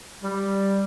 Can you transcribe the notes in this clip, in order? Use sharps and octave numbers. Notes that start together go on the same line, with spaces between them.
G3